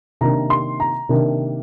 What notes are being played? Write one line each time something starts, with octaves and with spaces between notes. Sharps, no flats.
C3 D#3 A#3 D4 A#5
C6
A#5
C3 D#3 A#3 D4